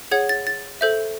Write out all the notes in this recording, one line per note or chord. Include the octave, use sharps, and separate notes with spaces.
G#4 C#5 F#5 G#6
A6
A6
A4 C5 E5 G6